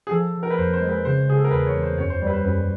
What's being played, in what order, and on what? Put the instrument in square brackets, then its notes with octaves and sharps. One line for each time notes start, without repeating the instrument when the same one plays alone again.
[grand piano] G#4
[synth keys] F3 [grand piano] A4
[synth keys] F3
[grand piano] A#4
B4
[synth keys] F2 [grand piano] C5
[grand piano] C5
[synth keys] G#3
[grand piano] B4
[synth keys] C#3 [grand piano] C5
[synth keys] C#3 [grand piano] G#4
[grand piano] A4
A#4
[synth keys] E2 [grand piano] B4
[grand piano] C#5
[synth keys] E2
[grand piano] C5
[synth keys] F#2 [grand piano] C#5
[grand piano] C5
[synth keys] G3 [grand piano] C#5
[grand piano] B4
C5
[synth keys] F#2 [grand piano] B4